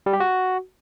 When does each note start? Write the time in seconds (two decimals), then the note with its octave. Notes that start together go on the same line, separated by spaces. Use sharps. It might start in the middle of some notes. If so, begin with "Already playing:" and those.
0.06 G3
0.13 G4
0.20 F#4